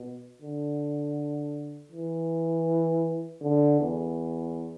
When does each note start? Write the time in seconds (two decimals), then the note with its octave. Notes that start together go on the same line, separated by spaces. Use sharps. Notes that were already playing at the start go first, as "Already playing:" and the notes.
Already playing: B2
0.42 D3
1.92 E3
3.42 D3
3.80 E2